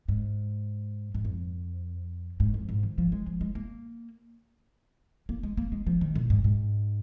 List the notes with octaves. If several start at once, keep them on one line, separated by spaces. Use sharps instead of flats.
G#2
G#2
F2
G#2
F2
G#2
D#3
F3
G#3
F3
G#3
A#3
A#3
G#3
A#3
G#3
F3
D#3
A#2
G#2
G#2